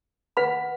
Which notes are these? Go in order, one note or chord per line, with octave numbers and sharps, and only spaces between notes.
B4 F#5 B5